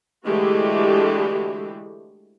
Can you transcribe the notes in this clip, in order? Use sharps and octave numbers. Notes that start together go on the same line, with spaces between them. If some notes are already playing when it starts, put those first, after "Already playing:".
D3 E3 G#3 A3 F#4 G4